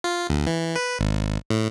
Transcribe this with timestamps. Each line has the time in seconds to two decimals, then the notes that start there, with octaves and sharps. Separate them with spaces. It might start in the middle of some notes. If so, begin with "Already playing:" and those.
0.04 F4
0.30 D2
0.47 E3
0.76 B4
0.99 G#1
1.50 A2